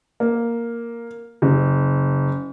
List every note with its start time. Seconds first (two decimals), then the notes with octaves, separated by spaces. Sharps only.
0.20 A#3
1.42 F#1